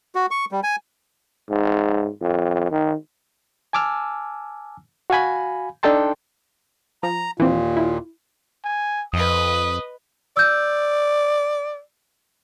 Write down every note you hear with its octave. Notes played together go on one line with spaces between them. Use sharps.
F#4
C#6
G3
G#5
G#2
F2
D#3
G#5 A5 D6 E6 F6
F#4 F5 G#5 B5
D4 D#4 A4 G5 A5 C6
F3 A#5
D#2 A#2 E3 C4 F4
E4
G#5
F2 B4 D#5 D#6
D5 E6 G6